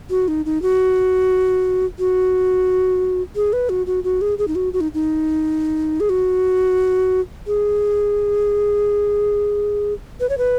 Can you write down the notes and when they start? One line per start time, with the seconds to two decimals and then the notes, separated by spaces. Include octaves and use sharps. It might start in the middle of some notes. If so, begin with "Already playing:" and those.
0.10 F#4
0.28 D#4
0.45 D#4
0.62 F#4
1.99 F#4
3.36 G#4
3.53 B4
3.69 F#4
3.87 F#4
4.04 F#4
4.21 G#4
4.38 G#4
4.48 D#4
4.55 F#4
4.73 F#4
4.81 D#4
4.94 D#4
6.00 G#4
6.09 F#4
7.47 G#4
10.20 B4
10.29 C#5
10.38 B4